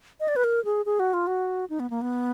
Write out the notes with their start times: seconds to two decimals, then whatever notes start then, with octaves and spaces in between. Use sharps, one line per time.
0.20 D#5
0.28 D5
0.36 B4
0.44 A#4
0.65 G#4
0.86 G#4
1.00 F#4
1.14 F4
1.27 F#4
1.70 D#4
1.80 B3
1.90 A#3
2.02 B3